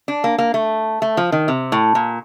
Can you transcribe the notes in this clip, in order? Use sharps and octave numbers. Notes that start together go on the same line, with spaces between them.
D4
A#3
A#3
A3
A3
F3
D#3
C3
A2
A#2